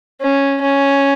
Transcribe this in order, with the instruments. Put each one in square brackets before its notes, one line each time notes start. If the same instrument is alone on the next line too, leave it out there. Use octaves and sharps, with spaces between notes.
[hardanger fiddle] C#4
C#4